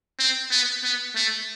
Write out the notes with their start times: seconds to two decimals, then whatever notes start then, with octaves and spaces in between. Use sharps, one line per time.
0.19 C4
0.51 B3
0.84 B3
1.16 A3